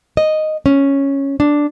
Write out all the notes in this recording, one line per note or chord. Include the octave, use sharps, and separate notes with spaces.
D#5
C#4
D4